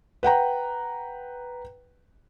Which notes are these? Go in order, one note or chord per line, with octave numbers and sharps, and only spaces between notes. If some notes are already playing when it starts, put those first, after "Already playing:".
B4 F#5 G5 A#5